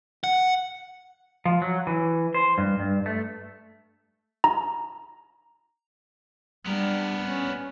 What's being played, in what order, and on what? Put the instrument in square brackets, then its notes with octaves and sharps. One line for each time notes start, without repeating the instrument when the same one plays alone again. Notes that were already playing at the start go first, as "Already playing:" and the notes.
[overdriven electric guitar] F#5
[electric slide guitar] F3
F#3
E3
C5
G2
G2
A3
[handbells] A#5
[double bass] G3 D4 [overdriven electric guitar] B3 A#4
[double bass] C#4